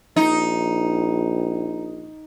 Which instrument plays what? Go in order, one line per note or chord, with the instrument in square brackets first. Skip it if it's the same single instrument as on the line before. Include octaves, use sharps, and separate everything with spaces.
[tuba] A#1 [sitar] D#4